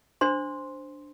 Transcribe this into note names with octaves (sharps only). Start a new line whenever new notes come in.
D4 C5 C6